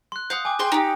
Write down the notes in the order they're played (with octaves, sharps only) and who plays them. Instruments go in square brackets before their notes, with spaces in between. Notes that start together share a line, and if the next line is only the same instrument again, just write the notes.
[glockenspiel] C6 F#6
[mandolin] F5 F#5 [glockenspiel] D#6 G6
[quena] G5 [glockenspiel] G#5 D6
[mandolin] G#4 C6 G6 [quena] G5
[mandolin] D#4 G4